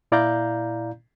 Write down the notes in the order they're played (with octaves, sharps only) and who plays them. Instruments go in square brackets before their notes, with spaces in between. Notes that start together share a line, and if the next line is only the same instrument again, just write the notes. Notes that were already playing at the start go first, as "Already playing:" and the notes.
[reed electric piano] A#2 E4 D5 F5 A#5 G6